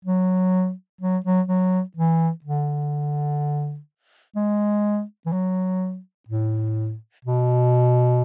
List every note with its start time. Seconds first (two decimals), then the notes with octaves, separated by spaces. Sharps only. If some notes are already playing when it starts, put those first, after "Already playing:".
0.05 F#3
1.01 F#3
1.25 F#3
1.48 F#3
1.97 E3
2.44 D3
4.36 G#3
5.26 E3
5.32 F#3
6.28 A2
7.25 B2